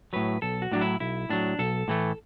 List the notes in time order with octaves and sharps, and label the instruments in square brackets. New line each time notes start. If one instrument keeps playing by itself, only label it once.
[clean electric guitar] A2 F#3 B4
B1 A4
F#4
A2 F#3 D4
E4
B1 E4
A2 F#3 D4
B1 A4
A2 E3 A3